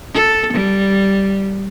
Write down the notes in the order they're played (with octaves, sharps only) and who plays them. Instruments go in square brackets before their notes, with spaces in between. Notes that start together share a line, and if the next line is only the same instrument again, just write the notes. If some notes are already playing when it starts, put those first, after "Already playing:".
[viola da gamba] A4
G3